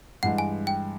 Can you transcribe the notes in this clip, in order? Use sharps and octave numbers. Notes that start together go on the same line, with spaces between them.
G2 E3 G#3 F#5
G#5
G5